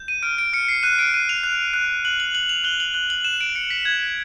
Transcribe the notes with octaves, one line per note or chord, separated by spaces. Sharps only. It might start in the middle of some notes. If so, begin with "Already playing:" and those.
Already playing: G6
D#7
F6 D7
D7
F6 C#7
C7
F#6 D#7
D7
F#6 D#7
F7
F#6
F#6
F#6 F#7
F#7
F#6 F#7
F7
F#6 G7
F#7
F#6 G7
F#7
F#6 E7
D7
F#6 C#7
B6
F#6 G#6